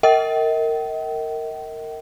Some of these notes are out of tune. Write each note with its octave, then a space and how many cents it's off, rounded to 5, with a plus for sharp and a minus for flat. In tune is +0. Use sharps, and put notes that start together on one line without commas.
A#4 -20 D#5 +45 G5 -40